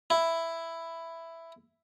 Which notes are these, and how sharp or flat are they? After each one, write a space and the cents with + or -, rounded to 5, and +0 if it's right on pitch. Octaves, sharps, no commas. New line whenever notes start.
E4 +5